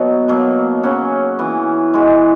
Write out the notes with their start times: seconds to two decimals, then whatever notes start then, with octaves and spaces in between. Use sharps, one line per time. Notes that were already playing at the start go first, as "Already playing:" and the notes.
Already playing: B2 F#3 B3 D#4 F#4
0.28 B2 F#3 A#3
0.83 C#3 F#3 C#4 F#4
1.39 E3 B3 F#4
1.94 E3 G#3 D#4 F#4